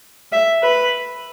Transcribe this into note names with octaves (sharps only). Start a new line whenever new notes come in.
E5
B4